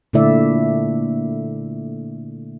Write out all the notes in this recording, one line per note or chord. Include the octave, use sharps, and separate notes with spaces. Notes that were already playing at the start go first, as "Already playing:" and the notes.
A#2 D3 A3 E4 D5 E5